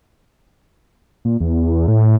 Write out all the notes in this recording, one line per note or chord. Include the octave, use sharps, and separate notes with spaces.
A#2
E2
A2